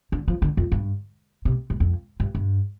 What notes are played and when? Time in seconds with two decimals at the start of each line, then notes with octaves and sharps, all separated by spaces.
0.12 D3
0.28 F3
0.42 D3
0.57 F2
0.72 G2
1.45 C3
1.70 G2
1.80 F2
2.20 G2
2.35 G2